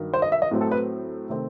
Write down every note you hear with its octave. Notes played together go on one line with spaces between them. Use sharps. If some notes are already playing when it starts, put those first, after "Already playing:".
Already playing: G2 D#3 F#3
C5
D#5
E5
D#5
A2 F#3 A3 C4
A4
B4
C3 D#3 A3 C4